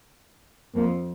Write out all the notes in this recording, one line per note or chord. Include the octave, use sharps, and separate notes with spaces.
F2 F3 A#3